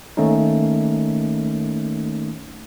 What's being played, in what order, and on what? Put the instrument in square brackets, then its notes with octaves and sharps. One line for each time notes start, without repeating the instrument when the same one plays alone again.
[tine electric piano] D#3 A3 A#3 C#4 D#4